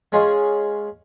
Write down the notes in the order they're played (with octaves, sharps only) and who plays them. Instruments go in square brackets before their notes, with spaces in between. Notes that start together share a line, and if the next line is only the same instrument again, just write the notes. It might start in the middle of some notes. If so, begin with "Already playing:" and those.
[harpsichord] G#3 C#4 F4 G#4 D#5